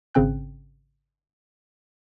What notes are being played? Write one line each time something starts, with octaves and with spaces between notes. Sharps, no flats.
G#1 C#3 C4 G5 F#6